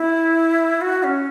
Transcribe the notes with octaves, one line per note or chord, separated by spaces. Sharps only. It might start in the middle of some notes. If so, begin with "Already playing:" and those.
Already playing: E4
F#4
C#4